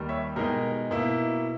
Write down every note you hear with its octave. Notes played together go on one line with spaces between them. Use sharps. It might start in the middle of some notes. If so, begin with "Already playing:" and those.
Already playing: D#2 D#3 G3
C#5 E5
B2 G#3 D#4 G4 A#4
B2 A#3 E4